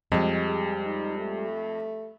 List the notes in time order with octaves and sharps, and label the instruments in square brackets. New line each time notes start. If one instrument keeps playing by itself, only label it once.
[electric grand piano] F2 [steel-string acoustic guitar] G3 G#3
[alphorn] G#4
D#4
A3